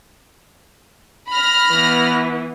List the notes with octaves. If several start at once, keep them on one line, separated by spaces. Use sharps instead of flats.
B5 F6 A#6
E3 B3